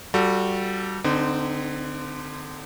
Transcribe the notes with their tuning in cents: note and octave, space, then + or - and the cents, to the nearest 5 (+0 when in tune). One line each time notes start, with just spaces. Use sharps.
G3 -20 F#4 -30 A4 +10
D3 +10 C4 -25 D#4 -15